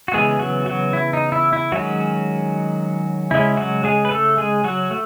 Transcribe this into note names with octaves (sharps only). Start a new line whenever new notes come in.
F#4
C#3 E3 G#3 B3 G#4
F#3 F#4
F#3 F#4
E4
D#4
E4
E4
D#3 F#3 G#3 C#4 F#4
C#3 G#3 C#4 E4
F#3 F#4
G#3 G#4
B4
A3 A4
G#3 G#4
F#3 F#4
A3